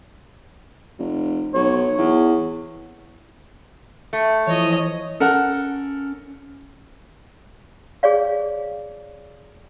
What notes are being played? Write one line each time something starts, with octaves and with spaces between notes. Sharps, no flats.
F1
B1 C#5
E2
A3
E3 F3 C#5 D#5 D#6
C#4 A4 A#4 F#5
G#4 C#5 D5 F5